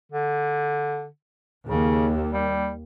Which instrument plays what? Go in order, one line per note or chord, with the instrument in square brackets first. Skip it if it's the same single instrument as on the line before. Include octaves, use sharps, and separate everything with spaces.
[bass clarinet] D3
[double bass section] D#2 [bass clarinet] C#3
[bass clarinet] G3